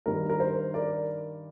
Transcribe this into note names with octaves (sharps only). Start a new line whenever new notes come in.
G2 D#3 A#4
A#4
C5
A#4 D5